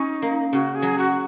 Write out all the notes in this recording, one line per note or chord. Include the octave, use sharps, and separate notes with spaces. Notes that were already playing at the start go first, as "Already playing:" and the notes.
Already playing: C#4 D#4
A#3
C#3 F#4
G#4
F#3
F#4